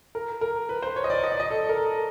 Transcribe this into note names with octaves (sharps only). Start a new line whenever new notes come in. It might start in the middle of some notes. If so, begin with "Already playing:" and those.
A#4
A#4
B4
C5
C#5
D#5
D5
D#5
D5
D#5
A4
A#4
A4